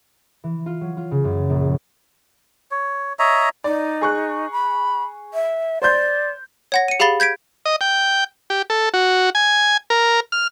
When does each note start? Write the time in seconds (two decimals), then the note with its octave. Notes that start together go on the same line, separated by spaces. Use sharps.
0.44 E3
0.66 F4
0.81 F#3
0.97 F4
1.11 C#3
1.24 F#2
1.50 A#1
2.71 C#5
3.19 C#5 D#5 E5 A#5
3.64 D#4 D5
4.01 G#4 C#6 F#6
4.52 B5
5.34 E5
5.82 C5 D5 C6 G6
6.72 C#5 F#5 A#6
6.88 C#7 D#7
7.00 G4 G#4 F5 B5 A6 G7
7.20 G6 G#6 B6 D7
7.66 D#5
7.81 G5
8.50 G4
8.70 A4
8.94 F#4
9.35 G#5
9.90 A#4
10.32 F6